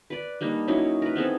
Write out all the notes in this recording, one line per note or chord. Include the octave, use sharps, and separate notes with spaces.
B4 D5
G3 A#3 D4 D#4
F#3 C#4 D#4 E4
A#4 B4
B3 C4 G#4 A4